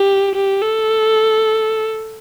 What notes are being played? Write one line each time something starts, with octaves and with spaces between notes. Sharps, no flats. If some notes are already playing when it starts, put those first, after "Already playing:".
Already playing: G4
G4
A4